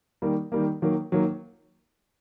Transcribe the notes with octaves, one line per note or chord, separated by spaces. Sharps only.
D#3 G3 A#3
D#3 G3 A#3
D#3 F#3 A#3
D#3 F#3 A#3